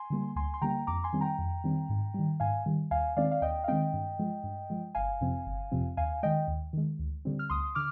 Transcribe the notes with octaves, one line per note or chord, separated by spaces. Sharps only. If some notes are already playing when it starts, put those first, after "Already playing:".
Already playing: G#5 C6
D3 G3 A#3
D2 G#5 C6
C6
D3 G3 A#3 G5 A#5
F2 A#5 D6
G#5 C6
D#3 G3 C4
G5 A#5
F2
D#3 G3 C4
G#2
D#3 G3
G#2 F5 G#5
D#3 G3
D#2 F5 G#5
D#3 G#3 C4 D5 F5
F5
D#2 D#5 G5
F5
D#3 G#3 C4 D#5 G5
G2
F3 G#3
G2
F3 G#3
G1 F5 G#5
F2 C3 F3 C4
G1
F2 C3 F3 C4
D#2 F5 G#5
D#3 G#3 D#5 G5
D#2
D#3 G#3
D2
D3 G3 C4
F6
D2 C6 D#6
D3 D6 F6